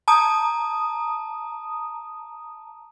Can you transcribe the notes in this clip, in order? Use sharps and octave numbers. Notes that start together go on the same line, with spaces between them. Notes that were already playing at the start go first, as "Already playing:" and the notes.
A5 A#5 D#6